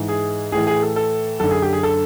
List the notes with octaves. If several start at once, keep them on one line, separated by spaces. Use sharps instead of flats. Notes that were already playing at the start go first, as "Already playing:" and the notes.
Already playing: G#2 E3
G#4
A2 E3 G#4
G#4
A4
A4
F#2 D3 A4
G#4
G4
G#4
A4